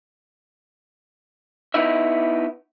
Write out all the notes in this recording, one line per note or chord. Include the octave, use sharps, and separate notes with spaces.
B3 D#4 E4 E5